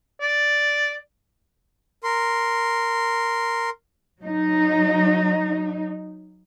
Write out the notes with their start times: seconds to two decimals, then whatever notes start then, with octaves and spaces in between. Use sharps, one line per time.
0.21 D5
2.04 A#4 C6
4.20 F#3 D#4